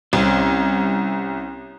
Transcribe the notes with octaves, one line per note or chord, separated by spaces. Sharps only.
C2 C4 C#4